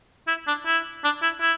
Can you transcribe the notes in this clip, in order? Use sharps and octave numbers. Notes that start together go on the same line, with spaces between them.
E4
D4
E4
D4
E4
E4